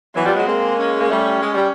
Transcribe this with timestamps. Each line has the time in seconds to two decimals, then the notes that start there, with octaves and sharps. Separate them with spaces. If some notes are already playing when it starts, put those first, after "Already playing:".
0.15 E3 F#3 B3
0.25 F3 G3
0.35 F#3 G#3
0.47 G#3 A#3 C4
0.78 C#4
1.00 A#3
1.09 G3 A3
1.42 G#3
1.54 G3